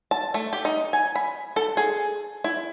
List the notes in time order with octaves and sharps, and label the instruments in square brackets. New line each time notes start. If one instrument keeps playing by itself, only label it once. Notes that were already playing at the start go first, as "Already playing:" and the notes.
[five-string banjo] A5
A3
G4
D#4
G#5
B5
A4
G#4
E4